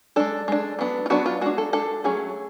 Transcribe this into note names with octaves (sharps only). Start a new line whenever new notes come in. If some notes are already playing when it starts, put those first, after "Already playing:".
G#3 D4 A4
G#3 D4
F#3 B3 D4
F4
F#3 B3 D4 F#4
F4
G#3 D4 F#4
A4
G#3 D4 A4
F#3 A3 C#4 G#4